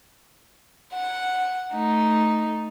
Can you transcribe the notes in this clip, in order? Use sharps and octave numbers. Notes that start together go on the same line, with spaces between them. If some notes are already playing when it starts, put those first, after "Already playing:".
F#5
A3 D#4